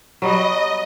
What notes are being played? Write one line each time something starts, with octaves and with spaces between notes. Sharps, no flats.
F#3 G3 B3 D#5